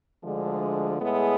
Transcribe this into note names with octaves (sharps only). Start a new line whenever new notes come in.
D2 D3 F3 G#3
A2 G#3 B3 E4 G#4